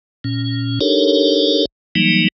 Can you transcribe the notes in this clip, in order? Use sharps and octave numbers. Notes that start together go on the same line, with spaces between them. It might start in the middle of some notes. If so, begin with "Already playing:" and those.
A#2 C#4
D4 D#4 G4 A4 A#4 C#5
E3 F#3 G3 A#3 D#4